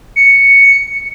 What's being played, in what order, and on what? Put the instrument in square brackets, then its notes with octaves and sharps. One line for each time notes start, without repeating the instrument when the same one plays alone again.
[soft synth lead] C#7